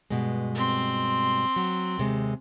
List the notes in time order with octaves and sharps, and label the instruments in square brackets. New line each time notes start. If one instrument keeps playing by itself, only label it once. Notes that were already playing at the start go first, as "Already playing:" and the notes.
[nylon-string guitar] G2 B2 G#3
[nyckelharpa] C4 C6
[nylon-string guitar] F#3
D#2 C3 G#3